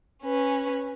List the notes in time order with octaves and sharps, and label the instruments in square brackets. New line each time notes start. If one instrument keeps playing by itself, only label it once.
[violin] C#4 B4